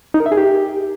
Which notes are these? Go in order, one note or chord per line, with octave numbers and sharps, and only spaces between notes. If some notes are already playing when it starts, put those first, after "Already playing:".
D#4
A#4
E5
G#4
G4